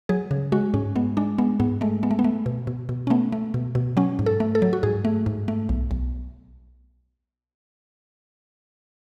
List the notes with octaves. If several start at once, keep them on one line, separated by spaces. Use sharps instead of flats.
F#3 G#4
C#3
G#3 F#4
G#2 C#4
G#3 B3
G#3 D4
G#3 B3
G#2 B3
G#3 A3
G#3 B3
A3
B3
A3
B2
B2
B2
C#4
A3 B3
A3
B2
B2
F#3 C#4
G#2
A4
A3
A4
F#3
F#4
G#2 G#4
A3
G#2
A3
B1
B1